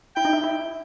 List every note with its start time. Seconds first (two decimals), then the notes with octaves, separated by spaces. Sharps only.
0.16 E4 G5
0.25 D#4
0.33 E4
0.44 E4